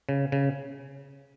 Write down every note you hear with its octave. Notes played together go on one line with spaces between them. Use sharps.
C#3
C#3